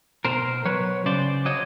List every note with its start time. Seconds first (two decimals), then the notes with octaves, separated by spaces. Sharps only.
0.25 B2 A#4 C5
0.65 F#3 B4 C#5
1.06 C#3 C5 D5
1.45 F#3 C#5 D#5